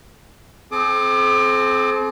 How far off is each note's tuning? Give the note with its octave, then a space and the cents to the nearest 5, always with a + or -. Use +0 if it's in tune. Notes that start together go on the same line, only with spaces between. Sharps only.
C4 +0 A4 -45 D6 +30